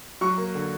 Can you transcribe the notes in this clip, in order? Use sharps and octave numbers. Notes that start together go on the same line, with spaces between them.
F#3 C#6
A#3
D3